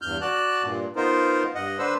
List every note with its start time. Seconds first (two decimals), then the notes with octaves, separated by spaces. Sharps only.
0.02 E2 G2 F6 G6
0.21 F#4 D5 A5 F#6
0.63 G2 A#2
0.96 B3 D#4 F4 A#4 C5
1.55 G2 D#5 F#5
1.78 D3 D4 B4 C5 E6